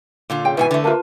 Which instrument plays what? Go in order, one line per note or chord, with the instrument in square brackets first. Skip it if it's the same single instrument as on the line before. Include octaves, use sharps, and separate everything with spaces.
[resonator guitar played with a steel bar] A#2 D3 F4
[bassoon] C#3 [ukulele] G5
[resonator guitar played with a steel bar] G#2 B2 G#5 [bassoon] E3
[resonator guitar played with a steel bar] D3 A3
[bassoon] A#3 [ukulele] F4 B4 A5